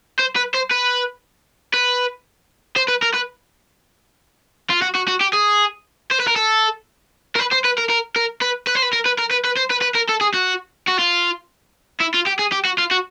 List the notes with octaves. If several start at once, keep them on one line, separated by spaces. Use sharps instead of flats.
C5
B4
C5
B4
B4
C5
B4
A#4
B4
F4
F#4
F#4
F#4
G4
G#4
C5
B4
A#4
A4
A#4
B4
C5
B4
A#4
A#4
A#4
B4
B4
C5
B4
A#4
B4
A#4
B4
B4
C5
B4
B4
A#4
A4
G#4
F#4
F#4
F4
E4
F4
G4
G#4
G4
F#4
F4
F#4